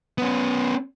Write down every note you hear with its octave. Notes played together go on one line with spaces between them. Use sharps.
B3 C#4